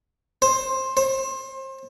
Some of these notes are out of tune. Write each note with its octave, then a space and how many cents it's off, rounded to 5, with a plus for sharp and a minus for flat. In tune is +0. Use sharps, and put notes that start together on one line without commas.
C5 +15
C5 +30